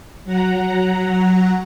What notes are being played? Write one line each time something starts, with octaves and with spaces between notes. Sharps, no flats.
F#3 F#5 A#5